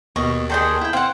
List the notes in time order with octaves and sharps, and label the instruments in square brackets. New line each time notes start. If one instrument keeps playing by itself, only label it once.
[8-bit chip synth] D#2 [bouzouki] B2 [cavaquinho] C#6
[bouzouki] D#3 D4 G#4 [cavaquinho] A4 C5 G5
[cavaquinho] E4 G5
[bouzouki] C4 F#5 [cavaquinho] F5